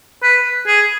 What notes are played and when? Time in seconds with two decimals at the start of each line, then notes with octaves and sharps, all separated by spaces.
0.23 B4
0.67 G#4